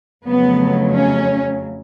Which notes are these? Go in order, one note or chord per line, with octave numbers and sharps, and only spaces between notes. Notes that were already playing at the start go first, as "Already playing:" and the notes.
F2 C#3 F#3 A3 B3
C#4